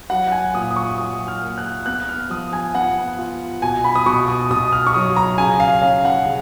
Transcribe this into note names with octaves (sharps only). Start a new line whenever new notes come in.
F#3 F#5
F#5
G#5
A#2 D#6
D#6
C#6
F#3 D#6
F6
A#3
F#6
B3 F#6
F6
F3 D#6
G#5
B3 F#5
F4
B2 G#5
B5
D#6
B2 C#6
D#6
B2 D#6
F6
C#6
F#3 D#6
A#5
C#3 G#5
F5
C#4 F5
F#5
C#3